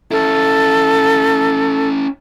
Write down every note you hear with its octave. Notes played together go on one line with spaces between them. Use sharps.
C#4 E4 A4